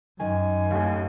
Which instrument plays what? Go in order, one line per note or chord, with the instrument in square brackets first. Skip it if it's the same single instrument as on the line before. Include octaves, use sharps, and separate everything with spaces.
[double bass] F#2 [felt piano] D#3 [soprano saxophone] G#5
[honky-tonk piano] D#2 A2